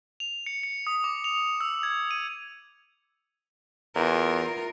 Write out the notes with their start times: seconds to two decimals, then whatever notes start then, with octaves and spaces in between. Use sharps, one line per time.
0.20 F7
0.46 C#7
0.63 C#7
0.87 D#6
1.04 D6
1.24 F7
1.61 E6
1.83 G#6
2.11 D#7
3.95 E2 F4 A#4